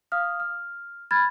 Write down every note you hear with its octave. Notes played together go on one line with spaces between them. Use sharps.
F5 D#6 F6
F6
B5 F6 G#6 A6